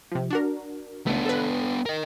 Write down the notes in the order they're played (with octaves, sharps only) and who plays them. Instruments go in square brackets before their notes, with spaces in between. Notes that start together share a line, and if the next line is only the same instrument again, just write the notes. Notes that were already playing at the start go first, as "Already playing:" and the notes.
[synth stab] C3 F3
D4 F#4 A#4
[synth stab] C#2 A3 [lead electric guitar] B3 D4
[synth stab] A4 B4
[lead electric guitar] A#4 D#5